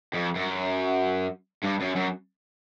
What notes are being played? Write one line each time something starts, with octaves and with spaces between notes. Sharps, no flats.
F2
F#2
G2
F#2
F#2